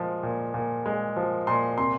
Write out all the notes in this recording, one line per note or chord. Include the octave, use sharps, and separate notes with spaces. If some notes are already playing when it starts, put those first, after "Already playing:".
Already playing: A#2 F3 G#3
A#2
A#2
G#3
F3
A#2 C6
C3 C6